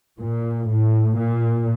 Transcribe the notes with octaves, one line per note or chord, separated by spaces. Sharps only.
A#2
A2
A#2